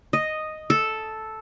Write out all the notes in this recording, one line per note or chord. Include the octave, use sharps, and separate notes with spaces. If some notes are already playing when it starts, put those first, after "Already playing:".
D#5
A4